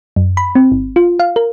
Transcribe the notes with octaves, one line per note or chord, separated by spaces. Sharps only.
F#2
B5
C4
G1
F4
F5
A#4